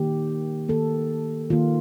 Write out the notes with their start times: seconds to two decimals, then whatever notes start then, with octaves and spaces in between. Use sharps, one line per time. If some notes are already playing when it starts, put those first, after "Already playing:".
Already playing: D#3 A#3 G4
0.68 D#3 A#3 A4
1.50 D#3 A#3 F4